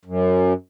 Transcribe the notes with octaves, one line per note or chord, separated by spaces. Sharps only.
F#2